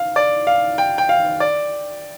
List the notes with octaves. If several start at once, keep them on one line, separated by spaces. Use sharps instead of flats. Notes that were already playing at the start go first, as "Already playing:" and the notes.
Already playing: F5
D5
F5
G5
G5
F5
D5